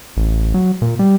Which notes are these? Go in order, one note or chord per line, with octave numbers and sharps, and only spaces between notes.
A1
F#3
A#2
G3